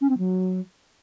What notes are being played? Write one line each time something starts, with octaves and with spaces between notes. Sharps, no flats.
C#4
C4
F#3